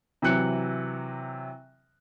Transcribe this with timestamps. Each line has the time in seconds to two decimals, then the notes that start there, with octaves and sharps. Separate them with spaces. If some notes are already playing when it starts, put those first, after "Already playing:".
0.22 C3 E3 F#3 F#6 C#7